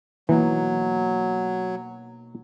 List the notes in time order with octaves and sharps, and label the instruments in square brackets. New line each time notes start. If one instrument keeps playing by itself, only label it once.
[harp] B2 A#3 D#4 [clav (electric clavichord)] E3 [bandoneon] F#3